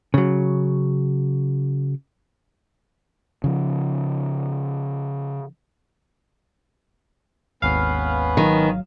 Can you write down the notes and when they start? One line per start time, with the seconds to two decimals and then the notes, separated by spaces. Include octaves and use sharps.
0.14 C#3 F#3
3.44 C#3 F3
7.62 G#1 D#2 B3 C#4 B4 F5
8.37 D#3 F#3